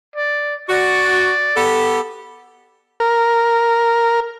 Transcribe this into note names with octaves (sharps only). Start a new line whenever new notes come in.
D5
F#4 D5
B3 G4 A4
A#4